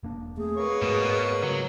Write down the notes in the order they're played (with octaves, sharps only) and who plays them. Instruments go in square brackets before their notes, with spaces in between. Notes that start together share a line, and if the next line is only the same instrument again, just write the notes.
[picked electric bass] E1 A#3 D4
[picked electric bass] A3 C4 [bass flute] G#4
[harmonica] A#3 B3 C#5
[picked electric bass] G#2 G#3 A3 [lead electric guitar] B2
[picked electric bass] C#3 [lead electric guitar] F#3